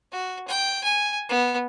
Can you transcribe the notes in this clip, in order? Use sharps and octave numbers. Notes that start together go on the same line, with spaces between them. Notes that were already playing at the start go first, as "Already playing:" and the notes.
F#4
G5
G#5
B3